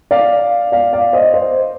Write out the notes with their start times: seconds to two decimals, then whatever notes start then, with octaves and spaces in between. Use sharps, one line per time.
0.11 D5 F5
0.72 D5 F5
0.93 D5 F5
1.13 C5 D#5
1.34 C5